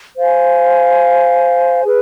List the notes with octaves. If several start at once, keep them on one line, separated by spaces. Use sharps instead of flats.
C5 F5 G#5
G#4 B4